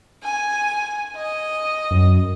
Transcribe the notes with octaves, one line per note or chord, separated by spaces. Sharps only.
G#5
D#5
F#2